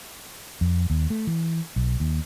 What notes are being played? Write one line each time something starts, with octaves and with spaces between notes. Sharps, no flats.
F2
D#2
A3
E3
B1
D#2